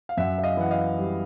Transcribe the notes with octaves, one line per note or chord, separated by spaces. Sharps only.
F5
F#2 E5 F#5
E5
D#5 F5
E3 F#5
D#5 F5
G3